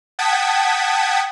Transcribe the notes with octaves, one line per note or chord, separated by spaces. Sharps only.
F#5 G5 A5 D#6 G#6 B6